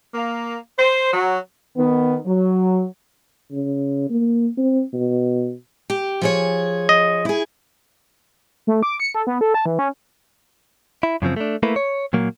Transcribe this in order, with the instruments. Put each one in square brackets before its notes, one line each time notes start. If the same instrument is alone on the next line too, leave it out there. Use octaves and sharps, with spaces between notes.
[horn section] A#3
C5
F#3
[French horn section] D#3 B3
F#3
[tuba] C#3
A#3
C4
B2
[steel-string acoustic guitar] G4
F3 G#4 C#5
[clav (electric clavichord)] D#5
[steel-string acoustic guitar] E4 G#4
[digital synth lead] A3
D6
C#7
A4
B3
A4
A5
E3
C#4
[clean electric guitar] E4
F#2 C#3 F3 C4
A3 D4
A3 A#3 E4 B4
C#5
A#2 F#3 A#3